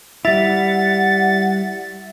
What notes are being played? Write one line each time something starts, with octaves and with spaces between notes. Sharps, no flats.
G3 E4 E5 F#5 A6